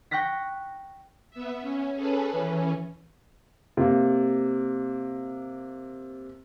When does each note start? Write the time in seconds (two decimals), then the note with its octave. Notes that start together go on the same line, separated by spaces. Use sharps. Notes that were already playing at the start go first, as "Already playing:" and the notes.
0.11 G5 C#6 F#6 A#6 B6
1.31 B3 E5
1.61 C#4
1.94 C#4 G#4 A4 B4
2.30 E3 C#4
3.77 C3 A#3